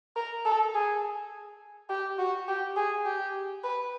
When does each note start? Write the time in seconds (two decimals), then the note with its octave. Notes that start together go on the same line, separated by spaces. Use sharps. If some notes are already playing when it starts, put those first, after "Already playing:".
0.16 A#4
0.45 A4
0.74 G#4
1.89 G4
2.19 F#4
2.48 G4
2.76 G#4
3.05 G4
3.64 B4